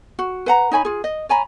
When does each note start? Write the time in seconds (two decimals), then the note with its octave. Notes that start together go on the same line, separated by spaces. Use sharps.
0.19 F#4
0.46 B4 F#5 A#5
0.71 D#4 C#5 G#5 B5
0.85 F4 G#4
1.04 D#5
1.29 C#5 G#5 A#5 B5